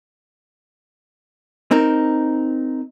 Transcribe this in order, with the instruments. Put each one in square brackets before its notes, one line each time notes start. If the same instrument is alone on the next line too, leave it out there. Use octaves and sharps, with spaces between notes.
[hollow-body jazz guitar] C4 D#4 A#4